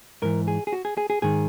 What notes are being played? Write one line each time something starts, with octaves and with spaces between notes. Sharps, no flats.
G#2 E3 A#4
G#4
G#4
F#4
G#4
G#4
G#4
G#2 D#3 G#4